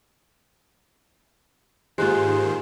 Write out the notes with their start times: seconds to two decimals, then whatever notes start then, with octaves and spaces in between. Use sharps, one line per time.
1.98 G#2 D#3 G#3 A#3 F4 G4 C5 F#6